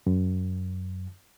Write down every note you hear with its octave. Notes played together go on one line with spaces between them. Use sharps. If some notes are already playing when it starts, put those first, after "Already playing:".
F#2